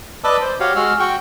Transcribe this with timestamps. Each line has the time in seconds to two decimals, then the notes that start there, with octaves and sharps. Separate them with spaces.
0.24 B4 D5 D#5 A5 D6 E6
0.41 C5
0.60 F#4 G4 C#5 F5
0.76 G#3 F#4 E6 F6
1.00 F#4 G5 C#6